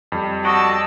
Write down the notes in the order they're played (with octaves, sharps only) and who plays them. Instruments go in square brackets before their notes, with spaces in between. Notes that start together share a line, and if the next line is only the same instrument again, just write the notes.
[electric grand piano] F2 G3
[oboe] F#4 [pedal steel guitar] D5 D#5 [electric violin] A5 E6